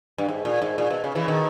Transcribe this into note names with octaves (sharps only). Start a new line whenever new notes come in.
G2
G#2
A#2
G#2
A#2
B2
C#3
C#3 E3
B2 D#3